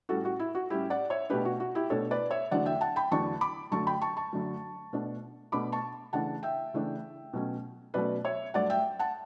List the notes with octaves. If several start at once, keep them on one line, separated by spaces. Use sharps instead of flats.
A2 G3 C#4 F#4 A4
F#4
E4
F#4
A2 G3 C#4 E4 G4
D5 F#5
C#5 E5
B2 A3 D4 G4 B4
F#4
F#4
E4 G4
B2 A3 D4 A4 C#5
B4 D5
C#5 E5
E2 D3 F#3 A3 D4 D5 F#5
E5 G5
F#5 A5
G5 B5
E2 D3 F#3 A3 D4 A5 C#6
B5 D6
F#2 D3 F#3 A3 A5 C#6
G5 B5
A5 C#6
A5 C#6
F#2 D3 F#3 A3
B2 A3 D4
B2 A3 D4 B5 D6
A5 C#6
C#3 E3 A3 D4 F#5 A5
E5 G5
C#3 E3 A3 D4
B2 F#3 A3 C#4
B2 F#3 A3 C#4 B4 D5
C#5 E5
G2 F#3 A3 D5 F#5
E5 G5
F#5 A5